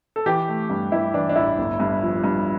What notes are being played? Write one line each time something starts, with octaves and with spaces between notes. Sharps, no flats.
A4
E3 G4
A3
G2
G2 E4
E3 D4
D4
A1 E4
G1
G2
F3
G2